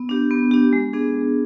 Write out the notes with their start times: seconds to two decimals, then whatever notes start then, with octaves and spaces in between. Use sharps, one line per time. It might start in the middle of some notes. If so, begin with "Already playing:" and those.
Already playing: B3
0.09 D4 G4
0.31 B3
0.51 D4 G4
0.73 G#3
0.93 B3 D4 G#4
1.14 G#3